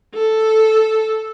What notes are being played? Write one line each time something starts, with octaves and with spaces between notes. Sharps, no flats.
A4